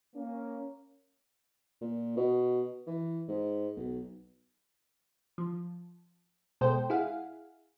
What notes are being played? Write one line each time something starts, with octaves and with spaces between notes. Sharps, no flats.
A#3 C#4
A#2
B2
E3
G#2
B1
F3
B2 G#3 A4 C5 G5
E4 G#4 F5 F#5